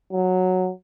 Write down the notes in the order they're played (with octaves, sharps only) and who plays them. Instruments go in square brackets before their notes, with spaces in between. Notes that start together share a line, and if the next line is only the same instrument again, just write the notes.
[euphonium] F#3